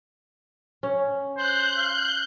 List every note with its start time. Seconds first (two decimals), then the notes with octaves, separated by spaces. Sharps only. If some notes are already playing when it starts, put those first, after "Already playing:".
0.83 C#4
1.37 C5 F#6 G6
1.77 F5